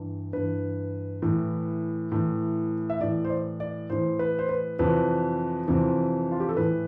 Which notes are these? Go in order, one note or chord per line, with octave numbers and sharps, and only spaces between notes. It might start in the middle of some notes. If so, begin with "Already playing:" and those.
Already playing: G2 E3
G2 E3 B4
A2 E3
A2 E3
E5
A2 E3 D5
C5
D5
D5
A2 E3 C5
B4
C5
B4
F2 C3 E3 B4
F2 C3 E3
F4
G4
A4
A2 E3 B4